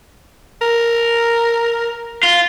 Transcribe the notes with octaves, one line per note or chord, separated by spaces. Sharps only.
A#4
F4